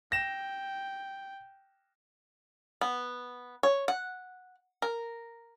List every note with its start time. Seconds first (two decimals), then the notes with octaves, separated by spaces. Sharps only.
0.12 G5 A#6 E7
2.81 B3
3.63 C#5
3.88 F#5
4.82 A#4